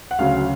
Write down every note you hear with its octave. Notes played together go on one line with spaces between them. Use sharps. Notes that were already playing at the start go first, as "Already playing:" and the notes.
F#5
D2 C#3 F#3 F5